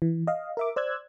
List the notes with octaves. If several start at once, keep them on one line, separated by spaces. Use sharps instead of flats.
E3
D#5 F5
A#4 E5 D6
C5 D5 E6 F#6 G#6